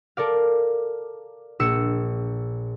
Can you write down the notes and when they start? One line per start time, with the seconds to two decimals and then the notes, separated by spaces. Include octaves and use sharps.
0.17 A4 A#4 D5 F5
1.59 A#1 E6 C#7